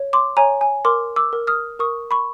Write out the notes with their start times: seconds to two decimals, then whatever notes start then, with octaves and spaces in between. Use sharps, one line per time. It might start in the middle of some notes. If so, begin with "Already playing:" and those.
Already playing: C#5
0.13 C6 D6
0.37 C#5 G#5 A#5
0.61 G#5
0.85 A#4 C6 D6
1.16 D6 E6
1.33 A#4
1.47 D#6 F6
1.79 A#4 C#6 D#6
2.11 B5 C#6